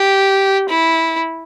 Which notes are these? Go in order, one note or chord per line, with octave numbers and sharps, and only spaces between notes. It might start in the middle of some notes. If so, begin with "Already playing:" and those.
Already playing: G4
E4